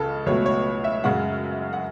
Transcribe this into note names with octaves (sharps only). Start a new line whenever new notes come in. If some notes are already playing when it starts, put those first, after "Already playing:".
Already playing: C#2 C#3 A4
C#2 B2 F#3 A3 C#5
C#5
E5
F#2 C#3 G#3 F#5
F#5